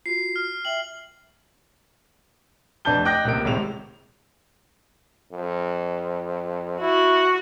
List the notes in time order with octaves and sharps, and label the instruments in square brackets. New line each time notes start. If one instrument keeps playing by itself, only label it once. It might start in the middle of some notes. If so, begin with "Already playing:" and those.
[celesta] F4 F#4 [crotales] C7
[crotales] F6
[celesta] E5 G5 [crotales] F#7
[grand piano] F1 D4 B4 A5 G6 G7
D#5 G5 D6 F#6 G6 A#6
C#2 C3 A#3 D7
G#1 A2 C3 G#3 F7
[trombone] F2
[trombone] E4 [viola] F#4